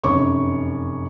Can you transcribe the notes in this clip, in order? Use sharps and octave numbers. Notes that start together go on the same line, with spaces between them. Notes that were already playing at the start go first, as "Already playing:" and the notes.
F1 F#2 C#5 C#6 D6